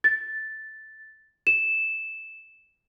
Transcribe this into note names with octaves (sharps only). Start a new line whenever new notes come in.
A6
E7